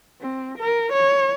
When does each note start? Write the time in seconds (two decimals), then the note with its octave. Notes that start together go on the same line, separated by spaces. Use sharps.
0.21 C4
0.58 A#4
0.93 C#5